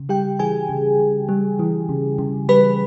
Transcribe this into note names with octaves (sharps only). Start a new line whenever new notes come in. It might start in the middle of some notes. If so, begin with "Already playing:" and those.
Already playing: C#3
G3 G4 G5
E3 G#4 G#5
C#3
C#3
G3
E3
C#3
C#3
G3 B4 B5